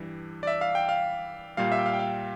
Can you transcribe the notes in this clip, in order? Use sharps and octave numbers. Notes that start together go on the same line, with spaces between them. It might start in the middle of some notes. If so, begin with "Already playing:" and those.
Already playing: G2 E3 G3
D5
E5
F5
G5
F5
A#2 G3 F5
E5
G5
F5
G5
F5